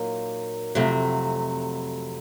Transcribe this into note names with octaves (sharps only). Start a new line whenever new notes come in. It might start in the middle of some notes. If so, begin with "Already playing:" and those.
Already playing: A#2 F#3 A#3 D#4
F2 C3 F#3 A3